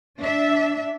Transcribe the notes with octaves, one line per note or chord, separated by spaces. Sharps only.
D4 E5